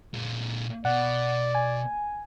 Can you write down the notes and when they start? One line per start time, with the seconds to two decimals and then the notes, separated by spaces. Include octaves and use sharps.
0.14 A#2 G#3
0.85 B2 D5 F#5
1.55 G#5